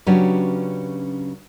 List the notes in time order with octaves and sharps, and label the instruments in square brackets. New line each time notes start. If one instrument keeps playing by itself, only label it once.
[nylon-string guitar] C#3 F#3 C#4 D4 G4 B4